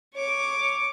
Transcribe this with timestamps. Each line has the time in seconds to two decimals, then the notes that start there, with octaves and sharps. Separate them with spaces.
0.15 C#5 D6